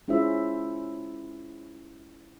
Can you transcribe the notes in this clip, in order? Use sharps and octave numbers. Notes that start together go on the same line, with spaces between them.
G#3 C#4 E4 F4 C5 E5